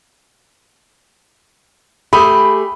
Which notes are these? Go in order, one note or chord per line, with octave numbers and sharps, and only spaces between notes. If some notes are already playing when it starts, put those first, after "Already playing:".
A3 G4 G#4 B5